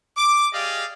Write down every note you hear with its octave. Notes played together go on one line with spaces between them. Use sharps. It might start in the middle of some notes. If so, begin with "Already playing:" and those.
D6
G4 G#4 D5 D#5 F5